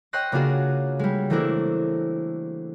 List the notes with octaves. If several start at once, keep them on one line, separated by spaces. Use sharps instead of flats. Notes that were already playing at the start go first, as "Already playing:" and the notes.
C#5 D#5 G5 C6 F#6 A#6
C#3 A#3 D4 F4 F#4 G#4
G3 G#3
E3 A3 A#3 C4 D4 E4